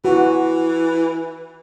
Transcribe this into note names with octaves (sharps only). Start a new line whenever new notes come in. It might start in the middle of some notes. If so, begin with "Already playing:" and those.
E3 F#4